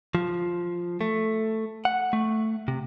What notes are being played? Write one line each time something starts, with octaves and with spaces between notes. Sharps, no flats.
F3
A3
F#5
A3
C3